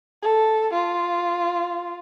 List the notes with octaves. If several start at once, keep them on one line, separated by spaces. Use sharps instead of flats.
A4
F4